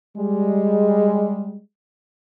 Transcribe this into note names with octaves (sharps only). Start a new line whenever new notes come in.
G3 G#3